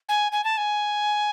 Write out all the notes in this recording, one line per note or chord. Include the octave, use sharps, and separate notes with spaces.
G#5
G#5
A5
G#5